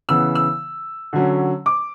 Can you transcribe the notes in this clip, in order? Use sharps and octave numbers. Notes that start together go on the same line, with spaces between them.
C#3 E3 B3 E6
E6
D3 F#3 C#4
D6